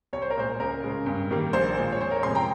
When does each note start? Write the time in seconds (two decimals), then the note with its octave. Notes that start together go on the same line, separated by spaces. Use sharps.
0.13 C2 C#5
0.22 C5
0.30 A#4
0.37 A#2 G#3 C5
0.59 C#2 A#4
0.83 C#3 G#3
1.06 G2
1.30 D#3 G3 A#3
1.53 A#1 C5
1.77 A#2 F3 G#3
1.92 C#5
2.00 F1 C5
2.11 A#4 C#5
2.23 F2 C3 F3 G#3 G#5 C6
2.35 G5 A#5